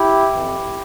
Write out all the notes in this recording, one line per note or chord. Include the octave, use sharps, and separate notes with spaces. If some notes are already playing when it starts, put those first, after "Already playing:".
Already playing: E4 G4
F2 E3